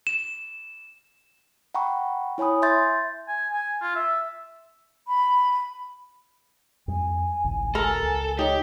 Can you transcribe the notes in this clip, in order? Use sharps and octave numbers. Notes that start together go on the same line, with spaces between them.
E7
F#5 G5 A#5 B5 C#6
E4 C#5 G#5 B5 D#6
E5 C6 G6 A6
G#5
G#5
F4
E5
B5
F2 G3 G#5
G#1 C#2 A2
A4 A#4
C#2
D#4 G4 C#5